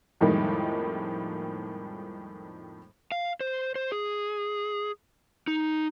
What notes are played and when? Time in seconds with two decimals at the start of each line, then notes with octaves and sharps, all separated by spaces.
0.21 F2 A2 D#3 G3 G#3 A#3
3.12 F5
3.40 C5
3.75 C5
3.92 G#4
5.47 D#4